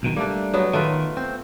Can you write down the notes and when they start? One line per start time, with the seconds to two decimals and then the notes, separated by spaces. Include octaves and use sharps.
0.03 B1 B2 D#3
0.16 G3 A3 A#3 D4
0.54 F#3 B3
0.73 D#3 A3 F4 B4
1.17 C4